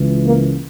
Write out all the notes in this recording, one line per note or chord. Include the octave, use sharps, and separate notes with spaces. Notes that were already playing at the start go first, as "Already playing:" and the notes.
Already playing: C#2 C#3 E3
A#3